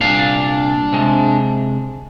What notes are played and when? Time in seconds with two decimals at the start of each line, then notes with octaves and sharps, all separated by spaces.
0.01 C2 A#2 D4 F5
0.92 C3 G#3